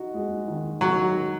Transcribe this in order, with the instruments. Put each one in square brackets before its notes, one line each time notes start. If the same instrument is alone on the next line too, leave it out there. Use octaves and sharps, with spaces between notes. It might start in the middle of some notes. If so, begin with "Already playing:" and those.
Already playing: [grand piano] D#4 F#4
G#3
D#3
[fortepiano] F#3 [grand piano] D#4
[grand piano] F#4